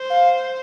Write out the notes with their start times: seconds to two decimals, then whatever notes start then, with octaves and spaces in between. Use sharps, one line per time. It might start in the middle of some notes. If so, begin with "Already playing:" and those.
Already playing: C5
0.10 F5